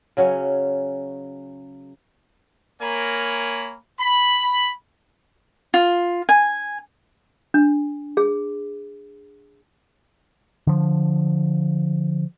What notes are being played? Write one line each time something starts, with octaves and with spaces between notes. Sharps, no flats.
C#3 F#3 C#4
A#3 A#4 C#5 G#5 B5
B5
F4
G#5
D4
G#4
D3 F3